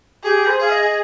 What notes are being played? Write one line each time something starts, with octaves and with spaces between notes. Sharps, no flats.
G4 G#4
C5
G#4 F5
D#5